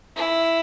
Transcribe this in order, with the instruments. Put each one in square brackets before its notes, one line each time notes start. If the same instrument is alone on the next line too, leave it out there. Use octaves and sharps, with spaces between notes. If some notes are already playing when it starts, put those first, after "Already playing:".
[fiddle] E4